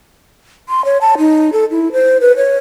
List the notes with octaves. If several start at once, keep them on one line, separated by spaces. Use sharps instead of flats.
C6
C#5
A5
D#4
A4
E4
C5
B4
C#5